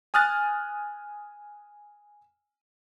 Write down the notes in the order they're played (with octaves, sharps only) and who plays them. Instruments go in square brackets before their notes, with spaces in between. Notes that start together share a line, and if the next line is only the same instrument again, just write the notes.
[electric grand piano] G#5 D#6 F6 F#6 A6